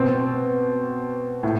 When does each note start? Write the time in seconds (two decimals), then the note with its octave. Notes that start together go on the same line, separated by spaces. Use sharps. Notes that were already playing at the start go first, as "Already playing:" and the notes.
Already playing: B2 C4
1.43 A2